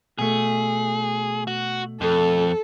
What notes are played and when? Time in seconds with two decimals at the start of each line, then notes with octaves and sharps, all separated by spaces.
0.19 B2 A3 G#4
1.47 F#4
2.01 F2 A4